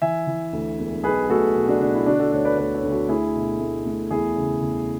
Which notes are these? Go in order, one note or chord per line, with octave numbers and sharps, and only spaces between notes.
E3 E5 G#5
E3
D2
E1
B1 G#4 B4
A3 F#4 A4
B2
D4 F#4
B2 D4
E4
D3 D4 F#4
F#4 A4
D2 A4 C#5
B4 D5
D2 B4 D5
A4 C#5
D2
F#4 A4
A3 E4 G#4
B2
A3
A3
E2 E4 G#4
C#3
E2